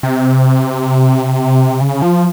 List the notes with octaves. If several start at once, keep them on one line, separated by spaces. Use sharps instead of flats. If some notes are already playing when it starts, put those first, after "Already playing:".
C3
C#3
F3